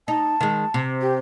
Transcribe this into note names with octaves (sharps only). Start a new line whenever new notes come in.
D#4 A5
D#3 G#3
C3
G4